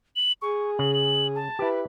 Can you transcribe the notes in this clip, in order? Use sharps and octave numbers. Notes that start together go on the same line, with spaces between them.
F#7
G#4 C#6
C#3 F#7
F#7
A5
E4 G4 B4